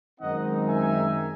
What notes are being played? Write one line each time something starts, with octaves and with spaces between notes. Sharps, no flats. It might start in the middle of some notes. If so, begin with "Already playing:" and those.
F#2 D#3 G#3 C4 D#4 D#5 F#5
E5 G#5